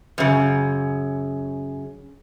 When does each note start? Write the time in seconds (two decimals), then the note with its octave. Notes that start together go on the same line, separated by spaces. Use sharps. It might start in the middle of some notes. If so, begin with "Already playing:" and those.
0.18 F#2 C#3